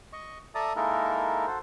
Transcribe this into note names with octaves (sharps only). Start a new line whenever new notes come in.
D#5 C#6
A4 D5 E5 A5 A#5 D#6
G#3 A#3 D#4 E4 A4 A#4
F#4 A4 C5